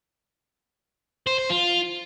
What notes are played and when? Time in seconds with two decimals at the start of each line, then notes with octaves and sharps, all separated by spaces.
1.27 C5
1.38 C5
1.50 F4